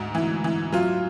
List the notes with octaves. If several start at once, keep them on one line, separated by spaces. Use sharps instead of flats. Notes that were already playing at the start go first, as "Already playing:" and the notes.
Already playing: D2 G#2
E3
E3
F#3 F4